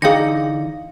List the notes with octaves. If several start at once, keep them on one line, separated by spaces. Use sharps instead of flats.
D3 E3 D#4 G#4 F5 G5 A#6 C#7